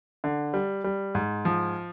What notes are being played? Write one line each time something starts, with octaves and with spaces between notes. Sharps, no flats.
D3
G3
G3
G#2
F3